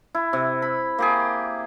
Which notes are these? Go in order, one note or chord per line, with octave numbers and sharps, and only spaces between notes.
E4
C3
B5
A#3 G4 G#4